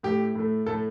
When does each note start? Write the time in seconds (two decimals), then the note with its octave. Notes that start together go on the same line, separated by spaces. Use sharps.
0.03 A2 A3 G4
0.35 A2 A3
0.66 A2 A3 A4